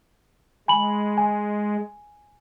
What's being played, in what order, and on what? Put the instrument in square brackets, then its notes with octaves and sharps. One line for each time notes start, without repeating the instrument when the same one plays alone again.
[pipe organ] G#3 [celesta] G#5 B5 F#7
[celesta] G#5